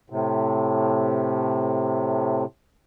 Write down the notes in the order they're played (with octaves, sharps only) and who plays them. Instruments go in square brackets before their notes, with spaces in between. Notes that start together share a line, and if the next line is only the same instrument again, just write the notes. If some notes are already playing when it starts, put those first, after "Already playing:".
[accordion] A2 C3